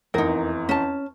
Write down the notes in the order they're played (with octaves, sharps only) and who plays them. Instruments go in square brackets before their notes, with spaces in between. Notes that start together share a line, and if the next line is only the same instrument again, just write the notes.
[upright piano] F1 E2 [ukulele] D#4 A#4
[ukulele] C#4 A5